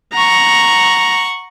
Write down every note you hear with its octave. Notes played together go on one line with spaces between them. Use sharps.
F#5 A#5 C#6